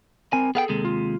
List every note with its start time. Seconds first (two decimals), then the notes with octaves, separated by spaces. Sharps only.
0.33 C4 A#4 G#5
0.55 B3 G#4 A4 F5 G5
0.69 D#2 C3 G#3
0.85 F4